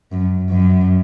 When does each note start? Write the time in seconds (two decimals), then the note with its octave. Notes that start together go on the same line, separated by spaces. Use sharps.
0.11 F#2
0.49 F#2